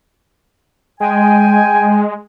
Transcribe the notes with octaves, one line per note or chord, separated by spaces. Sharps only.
G#3 G5 G#5